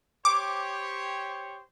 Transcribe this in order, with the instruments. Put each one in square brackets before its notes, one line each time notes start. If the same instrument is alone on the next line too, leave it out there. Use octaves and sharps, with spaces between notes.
[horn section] G4 C5 C#5 [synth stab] D6